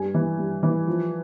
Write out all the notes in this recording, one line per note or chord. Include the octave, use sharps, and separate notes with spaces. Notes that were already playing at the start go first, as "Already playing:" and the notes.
Already playing: G2 G#5
E3
G2
E3
F3